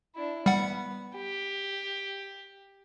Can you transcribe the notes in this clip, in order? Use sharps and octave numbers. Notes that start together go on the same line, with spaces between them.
D4 E4
G3 B3 F#5
G4